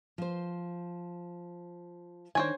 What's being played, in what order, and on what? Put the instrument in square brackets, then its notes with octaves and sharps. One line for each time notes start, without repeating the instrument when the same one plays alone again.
[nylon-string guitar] F3 C5
[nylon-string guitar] D#3 D4 [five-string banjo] C5 C#5 G#5